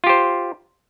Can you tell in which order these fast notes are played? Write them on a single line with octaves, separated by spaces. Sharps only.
F4 G4 C5